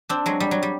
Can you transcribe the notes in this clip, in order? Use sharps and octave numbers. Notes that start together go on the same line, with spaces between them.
C4 D4
F#3 G#3
G3
F#3
G3